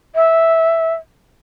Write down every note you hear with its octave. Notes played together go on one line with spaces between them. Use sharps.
E5